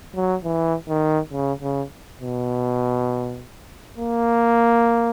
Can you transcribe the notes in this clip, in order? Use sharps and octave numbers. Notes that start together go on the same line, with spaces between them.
F#3
E3
D#3
C#3
C#3
B2
A#3